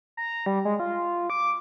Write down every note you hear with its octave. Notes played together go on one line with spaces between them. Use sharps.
A#5
G3
G#3
F4
D6